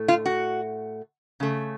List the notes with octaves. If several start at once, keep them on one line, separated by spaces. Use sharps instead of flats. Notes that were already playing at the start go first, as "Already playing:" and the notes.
Already playing: A2 A3
F4
F#4
C#3 A3